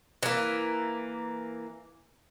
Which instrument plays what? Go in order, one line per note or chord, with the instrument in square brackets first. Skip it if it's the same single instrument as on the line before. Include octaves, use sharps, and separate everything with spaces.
[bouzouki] E3 A#3